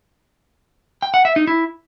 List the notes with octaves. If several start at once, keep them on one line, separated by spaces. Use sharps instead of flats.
G5
F#5
E5
D#4
E4